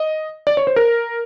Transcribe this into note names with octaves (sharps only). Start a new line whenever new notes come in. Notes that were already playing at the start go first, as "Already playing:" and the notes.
Already playing: D#5
D5
C#5
C5
A#4